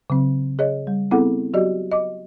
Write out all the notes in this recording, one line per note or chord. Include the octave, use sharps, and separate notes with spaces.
C#3 F#3 C4
G#4 C#5 D#5
G3
B3 C4 E4 G#4 A4 F#5
F#3 F#4 G4 D5 D#5
D#5 D6